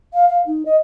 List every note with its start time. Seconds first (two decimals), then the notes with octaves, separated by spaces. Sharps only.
0.13 F5
0.29 F5
0.46 D#4
0.65 D#5